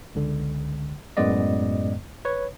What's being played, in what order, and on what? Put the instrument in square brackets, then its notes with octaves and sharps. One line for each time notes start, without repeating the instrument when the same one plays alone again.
[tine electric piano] C#2 D3
F#2 A2 G#3 B3 D5 D#5
B4 C#5